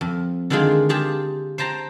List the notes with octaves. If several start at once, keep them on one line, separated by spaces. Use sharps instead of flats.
F2
D3 D#3 G#3 D4 F4 G#4
F4 G4 G#4 A5
C5 G5 A5 A#5